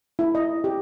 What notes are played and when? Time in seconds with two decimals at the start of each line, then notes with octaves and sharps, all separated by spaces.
0.19 E4
0.35 D#5
0.64 G4